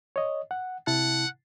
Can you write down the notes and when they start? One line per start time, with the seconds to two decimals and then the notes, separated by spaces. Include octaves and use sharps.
0.16 C#5 D#5
0.51 F#5
0.87 C3 E4 F#5 A5